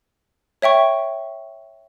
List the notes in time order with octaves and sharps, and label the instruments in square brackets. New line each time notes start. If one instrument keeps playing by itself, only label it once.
[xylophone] C#5 E5 G5 C#6